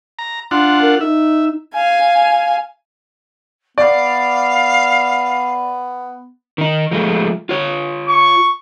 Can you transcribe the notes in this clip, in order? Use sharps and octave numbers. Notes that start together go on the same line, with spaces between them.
A#5
D4 F4 F#5 C6
A#4
D#4 E5
F5 G#5
B3 D5 F5
D#3 D#4
F3 G#3 A3
F4 C#5
C#6